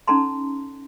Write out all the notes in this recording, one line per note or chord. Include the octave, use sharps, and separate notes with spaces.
C#4 D#4 A4 A5 A#5 C6